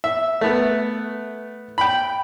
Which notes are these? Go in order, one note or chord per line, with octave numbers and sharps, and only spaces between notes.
E5
A3 B3
G5 B5